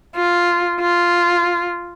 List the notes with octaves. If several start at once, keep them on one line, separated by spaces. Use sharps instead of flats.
F4
F4